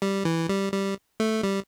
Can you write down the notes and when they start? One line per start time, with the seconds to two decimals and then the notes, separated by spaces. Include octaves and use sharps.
0.02 G3
0.25 E3
0.49 G3
0.73 G3
1.20 A3
1.43 G3